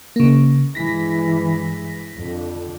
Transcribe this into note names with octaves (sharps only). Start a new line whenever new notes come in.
C#3 A#3
G2 E3 G#3 A#6 B6
F2 D3